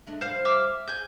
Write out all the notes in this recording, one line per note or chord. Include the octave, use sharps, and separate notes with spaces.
G#3 A3 D4
C3 F3 G3 C5 F5
E5 D6 F6
G#4 G#5 G6